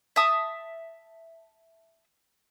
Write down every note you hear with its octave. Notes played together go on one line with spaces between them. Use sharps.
E5 A5 D#6